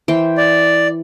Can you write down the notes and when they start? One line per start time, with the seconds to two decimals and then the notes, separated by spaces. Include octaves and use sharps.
0.08 E3 C5 G5
0.37 D5